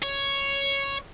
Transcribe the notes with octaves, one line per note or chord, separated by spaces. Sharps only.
C#5